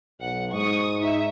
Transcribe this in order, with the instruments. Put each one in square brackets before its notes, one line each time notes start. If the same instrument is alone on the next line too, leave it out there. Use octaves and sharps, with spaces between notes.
[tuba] B1 [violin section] F#5
[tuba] G#2 [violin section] C#6 D#6
[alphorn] D#4 [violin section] E5